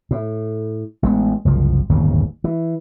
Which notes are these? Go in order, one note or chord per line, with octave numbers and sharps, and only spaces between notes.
A2
A1 G#3 B3
F#1 C2 F3
D1 G1 D#2 C#3
E3